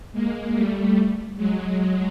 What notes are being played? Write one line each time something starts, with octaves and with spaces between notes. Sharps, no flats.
G#3 A#3
G3 A3
F#3 G#3
F#3 G#3